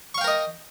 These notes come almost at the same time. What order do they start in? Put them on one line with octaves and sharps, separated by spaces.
C#6 F5 G5 A#4 D#5